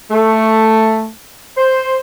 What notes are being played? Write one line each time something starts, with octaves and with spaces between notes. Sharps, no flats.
A3
C5